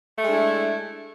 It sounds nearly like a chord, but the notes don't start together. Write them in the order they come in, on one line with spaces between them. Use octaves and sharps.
A3 G#3 D4 E4